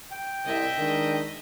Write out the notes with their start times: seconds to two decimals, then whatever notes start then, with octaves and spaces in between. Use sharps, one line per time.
0.11 G5
0.45 C2 D#5 E5
0.76 D#3 G#3 D4